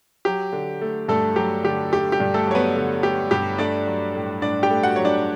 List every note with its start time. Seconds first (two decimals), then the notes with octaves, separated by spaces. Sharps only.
0.25 F#3 G4
0.53 D3
0.82 A3
1.08 G2 A3 A4
1.36 F#3 G4
1.64 D3 G4
1.92 A3 G4
2.12 G4
2.20 G2
2.34 A3 A4
2.47 F#3 C#5
2.55 B3 B4
2.76 D3
3.03 A3 G4
3.31 G2 G4
3.58 A3 D4 D5
3.87 F#3
4.15 A2
4.42 A2 D4 D5
4.63 G4 G5
4.70 A3
4.83 F#4 F#5
4.96 F#3 C#5
5.05 D4 D5